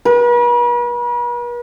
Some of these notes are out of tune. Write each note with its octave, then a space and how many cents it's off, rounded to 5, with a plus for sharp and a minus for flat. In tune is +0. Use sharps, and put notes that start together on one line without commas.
B4 -45